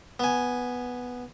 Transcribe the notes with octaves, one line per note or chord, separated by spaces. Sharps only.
B3 G#5